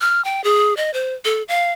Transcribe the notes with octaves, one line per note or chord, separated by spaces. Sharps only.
F6
G5
G#4
D#5
C5
A4
F5